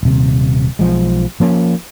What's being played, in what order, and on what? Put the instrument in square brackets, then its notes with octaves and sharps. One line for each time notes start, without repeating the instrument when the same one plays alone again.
[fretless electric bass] D#1 C3
B1 F3 G#3
F3 A#3 C#4